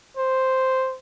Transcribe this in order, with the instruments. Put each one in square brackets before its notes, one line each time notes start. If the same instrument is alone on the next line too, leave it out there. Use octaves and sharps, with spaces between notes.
[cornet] C5